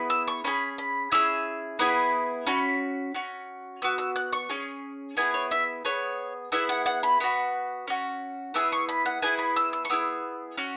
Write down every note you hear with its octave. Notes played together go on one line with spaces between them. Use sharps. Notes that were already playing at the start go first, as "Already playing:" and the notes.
Already playing: B3 E4 G#4
E6
C#6
C#4 E4 G#4 B5
B5
C#4 E4 G#4 E6
B3 E4 G#4 B5
C#4 F#4 B5
C#4 F#4
B3 F#4 E6
E6
F#6
C#6
C#4 G#4
B3 E4 G#4 G#5
C#5
E5
B3 G#4 C#5
B3 E4 G#4 E5
F#5
F#5
B5
B3 F#4
C#4 F#4
B3 E4 G#4 E6
C#6
B5
F#5
B3 E4 G#4 G#5
B5
E6
E6
C#6
B3 E4 G#4 E6
C#4 F#4